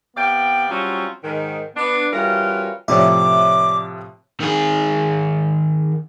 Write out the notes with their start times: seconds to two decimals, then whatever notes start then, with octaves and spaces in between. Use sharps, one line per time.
0.16 C3 B3 D5 F5 G5
0.69 F#3 G3 C4 C#4 F4 F#4
1.23 G#2 D#3
1.76 B3 D4
2.12 E3 G3 C#4 F4 F#4 A#4
2.88 A2 C3 F3 C#5 D5 E5 D6
4.40 D#3 G#4